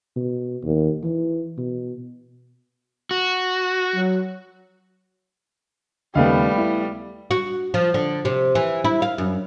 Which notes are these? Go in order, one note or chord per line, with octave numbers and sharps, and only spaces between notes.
B2
D#2
E3
B2
F#4
F#3
D#2 C#3 G3 A3 B3 D#5 F5
E4
F#4
F3
D3
C3
E3
E4
F5
F#2